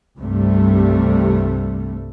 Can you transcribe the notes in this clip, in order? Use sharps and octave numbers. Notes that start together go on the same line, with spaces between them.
C2 G2 C3 G3 A3